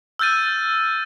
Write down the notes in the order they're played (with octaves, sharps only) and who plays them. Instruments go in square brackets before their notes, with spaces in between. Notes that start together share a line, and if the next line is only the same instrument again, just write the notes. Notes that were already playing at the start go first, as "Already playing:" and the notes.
[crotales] E6 F6 G6 A6 D#7